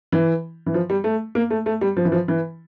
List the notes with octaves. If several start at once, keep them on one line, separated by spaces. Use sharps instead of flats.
E3
E3
F3
G3
A3
A#3
A3
A3
G3
F3
E3
F3
E3